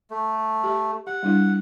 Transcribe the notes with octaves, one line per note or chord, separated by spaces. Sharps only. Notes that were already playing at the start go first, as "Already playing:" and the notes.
A3
G4 E5
G4 F#5
G3 D4 E4